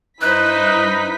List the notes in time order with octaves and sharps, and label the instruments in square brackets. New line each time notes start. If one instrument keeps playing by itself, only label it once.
[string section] G2 E4 B6 [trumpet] D#4 [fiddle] B4 C5 [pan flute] F#6